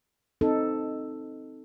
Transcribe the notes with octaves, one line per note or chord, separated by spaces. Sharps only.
C4 D#4 A4